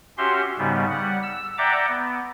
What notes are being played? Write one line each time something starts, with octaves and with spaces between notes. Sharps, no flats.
C#4 F#4 G4 E5 C6
G#2 C#3 G3 B3
G3 F#5
E6
D5 E5 F#5 G5 A#5 D6
B3